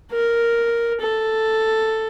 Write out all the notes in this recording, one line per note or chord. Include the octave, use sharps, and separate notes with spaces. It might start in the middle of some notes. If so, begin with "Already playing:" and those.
A#4
A4